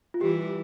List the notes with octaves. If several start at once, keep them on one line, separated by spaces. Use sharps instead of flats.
F4
E3 G3 G4